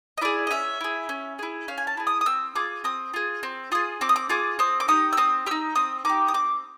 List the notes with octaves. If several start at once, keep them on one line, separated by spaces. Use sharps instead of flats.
D#5
E4 G#4 D5
D#5
C#4 E5
E4 G#4
C#4
E4 G#4
C#4 F5
G#5
A5
E4 G#4
D#6
D#6
C4 E6
F4 G#4 D6
C4 D#6
F4 G#4
C4
F4 G#4 D#6
C4 D6
D#6
D6
F4 G#4 D6
C4 D#6
D6
D#4 G4 D#6
E6
C4 D#6
D#4 G4 E6
C4 D#6
D#4 G4 D6
D#6
C4 D6